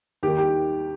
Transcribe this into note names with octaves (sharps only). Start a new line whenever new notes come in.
D#2 D#3 G4
G4